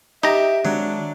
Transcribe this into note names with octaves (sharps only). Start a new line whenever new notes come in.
D#4 G4 E5 A#5
D#3 F#3 G#3 D4